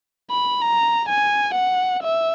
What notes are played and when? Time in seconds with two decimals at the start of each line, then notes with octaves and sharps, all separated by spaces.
0.30 B5
0.61 A#5
1.09 G#5
1.55 F#5
2.02 E5